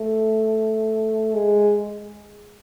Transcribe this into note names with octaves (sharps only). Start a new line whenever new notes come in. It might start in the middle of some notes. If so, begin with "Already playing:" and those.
Already playing: A3
G#3